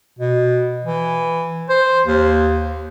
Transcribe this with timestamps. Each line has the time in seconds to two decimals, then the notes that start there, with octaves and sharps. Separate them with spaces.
0.19 B2
0.85 E3
1.69 C5
2.06 D#2